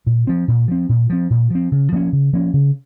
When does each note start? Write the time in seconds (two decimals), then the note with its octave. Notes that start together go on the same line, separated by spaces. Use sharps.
0.07 A#2
0.27 F3 C4
0.48 A#2
0.68 F3 C4
0.89 A#2
1.10 F3 C4
1.30 A#2
1.50 F3 C4
1.72 C#3
1.92 F3 A#3 C#4
2.13 C#3
2.33 F3 A#3 C#4
2.53 C#3